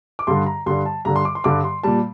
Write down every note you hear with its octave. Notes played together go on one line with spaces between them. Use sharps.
D6
G2 D3 G3 C6
A#5
G2 D3 G3 C6
A5
G2 D3 G3 A#5
C6
D6
C6
G2 D3 G3 D6
C6
A#2 G3 A5